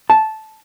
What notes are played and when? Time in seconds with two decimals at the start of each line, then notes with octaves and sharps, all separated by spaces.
0.10 A5